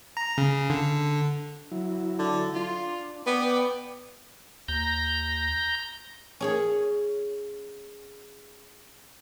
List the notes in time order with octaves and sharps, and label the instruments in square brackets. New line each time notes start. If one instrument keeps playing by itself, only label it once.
[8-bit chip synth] A#5
C#3
D3
[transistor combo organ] F#3 E4
[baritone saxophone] D3
[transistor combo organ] D4 [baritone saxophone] F4
[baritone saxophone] B3 [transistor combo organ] D5 G5 D6
[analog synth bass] D#2 [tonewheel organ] A#5 G6
[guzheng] C#4 G#4 C#5